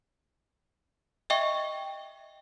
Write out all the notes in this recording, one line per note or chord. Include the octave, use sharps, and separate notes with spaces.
D#5 E5 G5 C#6